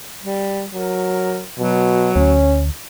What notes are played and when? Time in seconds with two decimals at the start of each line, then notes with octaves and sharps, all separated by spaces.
0.23 G3
0.73 F#3 A#4
1.58 B2 F#3
2.16 D2 C#4